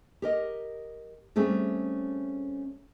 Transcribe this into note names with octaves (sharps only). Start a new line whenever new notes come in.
G4 A#4 D#5
G3 A3 C4 C#4 G#4